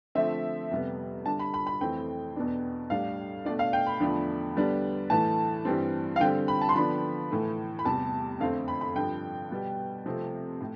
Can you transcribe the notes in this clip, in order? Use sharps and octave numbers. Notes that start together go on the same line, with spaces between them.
D3 F3 A3 C4 E5
F2 C3 G3 B3
D3 G3 D4 A5
B5
B5
B5
F2 E3 A3 C4 G5
E2 B2 B3 D4
A2 G3 D4 F5
B2 A3 D4 D5
F5
G5
B5
E2 D3 F3 A3 D4
D3 G3 B3 D4
A2 E3 A3 A5
G2 E3 G3 C4
F5
D3 G3 C4 G5
B5
A5
C6
D3 F3 B3 D4 B5
A2 E3 A3
B5
E2 C3 G3 A5
F2 D3 A3 C4 F5
B5
B5
G2 D3 F3 G5
B2 G3 B3
C3 F3 A3 C4
A2